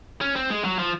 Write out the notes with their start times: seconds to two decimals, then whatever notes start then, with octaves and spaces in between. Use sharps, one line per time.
0.21 C#4
0.36 C4
0.50 G#3
0.64 F#3
0.79 F3